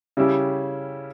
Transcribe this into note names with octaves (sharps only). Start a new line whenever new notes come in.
C#3 G3 C#4 E4 G4